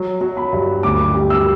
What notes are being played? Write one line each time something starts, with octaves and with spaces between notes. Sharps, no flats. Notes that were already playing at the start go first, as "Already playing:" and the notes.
Already playing: F#3
F#3
B5
G2
D2 D6
G3
E6